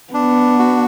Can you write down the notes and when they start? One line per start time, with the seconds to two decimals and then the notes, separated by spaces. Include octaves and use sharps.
0.13 B3 D4
0.59 F#4